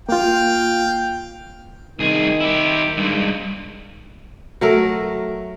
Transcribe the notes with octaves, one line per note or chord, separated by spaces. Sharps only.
A#3 F4 F5 G5
C2 D#3 G#4
E4 G4
G2 G#3
F#3 A3 A#4